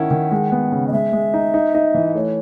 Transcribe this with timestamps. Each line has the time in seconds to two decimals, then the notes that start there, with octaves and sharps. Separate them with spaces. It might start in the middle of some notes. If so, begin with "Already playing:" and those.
Already playing: D#3 C#4 E4 F#5
0.11 D#3
0.31 G#3
0.52 B3
0.72 C#3
0.87 D#5
0.92 G#3 E5
1.13 G#3
1.34 D#4
1.54 D#4
1.74 D#4
1.94 E3
2.15 A3 C#5